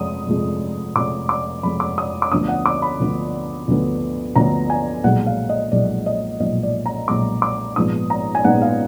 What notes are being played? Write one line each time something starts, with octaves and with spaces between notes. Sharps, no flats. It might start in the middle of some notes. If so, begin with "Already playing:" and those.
Already playing: F1 F2 F3 G#3 D#6
F1 F2 F3 G#3
F1 F2 F3 G#3 D6
D6
F1 F2 F3 G#3 B5
D6
D#6
D6
D2 D3 F3 B3 D4 D#6
F#5
D6
B5
D2 D3 F3 B3 D4
D2 D3 F3 B3 D4
D2 D3 F3 B3 D4 A#5
G#5
B1 A#2 F3 G#3 F#5
F5
D#5
B1 A#2 F3 G#3 D5
D#5
B1 A#2 F3 G#3 D#5
D5
A#5
B1 A#2 F3 G#3 D6
D6
A#1 G#2 F3 B3 D#4 D#6
A#5
G#5
A#1 G#2 F3 B3 D#4 F#5
F5